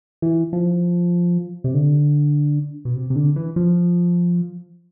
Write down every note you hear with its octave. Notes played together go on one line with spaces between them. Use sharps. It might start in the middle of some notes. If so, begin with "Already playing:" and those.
E3
F3
C3
D3
B2
C3
C3
D3
E3
F3